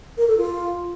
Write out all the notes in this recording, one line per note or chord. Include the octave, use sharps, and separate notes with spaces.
A#4
A4
F4